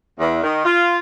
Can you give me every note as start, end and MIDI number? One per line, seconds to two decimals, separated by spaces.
0.19 0.43 40
0.43 0.62 51
0.65 0.98 65